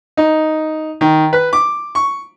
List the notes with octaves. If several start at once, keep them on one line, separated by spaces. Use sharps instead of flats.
D#4
D#3
B4
D6
C#6